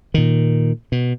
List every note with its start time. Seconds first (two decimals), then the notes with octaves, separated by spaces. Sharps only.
0.14 A#2 D#3
0.92 B2